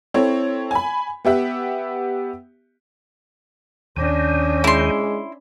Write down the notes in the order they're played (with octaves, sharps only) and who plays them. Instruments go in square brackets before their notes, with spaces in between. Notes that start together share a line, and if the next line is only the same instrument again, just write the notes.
[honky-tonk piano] C4 E4 A4 C#5
G#5 B5
B3 G4 E5 F#5
[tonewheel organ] D#2 D#3 [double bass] C#4 D4
[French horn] G#3 [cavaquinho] E4 C6